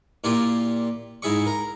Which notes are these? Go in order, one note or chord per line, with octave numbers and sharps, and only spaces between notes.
A#2 E4 F4 G4 C6
G#2 E4 G#4 E5 C#6
A#4